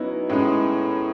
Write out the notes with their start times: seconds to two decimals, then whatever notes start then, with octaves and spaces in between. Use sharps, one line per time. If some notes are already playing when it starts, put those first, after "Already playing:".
Already playing: F#3 B3 C#4 D#4 E4
0.29 A2 G#3 C#4 D#4 E4